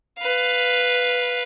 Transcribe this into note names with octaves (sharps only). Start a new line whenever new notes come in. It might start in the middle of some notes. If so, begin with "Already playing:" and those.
B4 F5